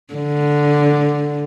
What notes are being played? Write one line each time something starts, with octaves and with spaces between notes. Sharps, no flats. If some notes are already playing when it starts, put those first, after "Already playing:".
D3